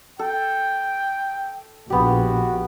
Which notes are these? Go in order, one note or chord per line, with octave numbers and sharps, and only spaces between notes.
A4 G5
A#1 B3 F#4 G4